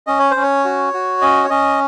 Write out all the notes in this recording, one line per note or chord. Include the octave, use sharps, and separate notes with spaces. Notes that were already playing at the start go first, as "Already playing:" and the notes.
C#4 D#5
C#5
C5
C#4
C#5
F#4
F#4
C#4 D#5
C#5
C#4 D#5